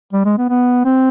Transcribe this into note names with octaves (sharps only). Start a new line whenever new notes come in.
G3
G#3
B3
B3
C4